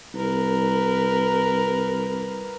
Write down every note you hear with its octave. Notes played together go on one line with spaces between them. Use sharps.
C2 A#4 B4